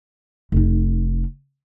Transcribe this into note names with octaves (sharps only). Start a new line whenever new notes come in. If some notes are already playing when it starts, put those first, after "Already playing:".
F1 D#4